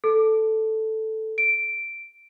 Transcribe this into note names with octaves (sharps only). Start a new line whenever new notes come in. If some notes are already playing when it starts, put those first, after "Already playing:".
A4
D7